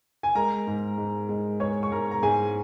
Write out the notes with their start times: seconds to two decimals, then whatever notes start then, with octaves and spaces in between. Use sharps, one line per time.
0.23 G#5
0.35 G#3 A#4 A#5
0.67 G#2
0.98 G#2
1.29 G#3
1.60 G#3 C#5 C#6
1.83 C#6
1.92 G#2 A#4 A#5
2.11 A#5
2.23 G#2 G#4 G#5